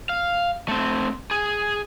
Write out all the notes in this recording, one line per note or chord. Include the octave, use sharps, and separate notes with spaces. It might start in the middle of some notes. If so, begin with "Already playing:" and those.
F5
A3 C4
G#4